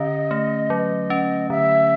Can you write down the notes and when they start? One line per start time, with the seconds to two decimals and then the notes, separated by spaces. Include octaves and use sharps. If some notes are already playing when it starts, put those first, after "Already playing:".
Already playing: D3 C#4 D#5
0.31 A3
0.70 F#3
1.10 C#4
1.50 D3 E5